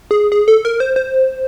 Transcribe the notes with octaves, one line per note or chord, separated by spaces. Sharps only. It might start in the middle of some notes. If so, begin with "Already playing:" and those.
G#4
G#4
A4
A#4
C5
C5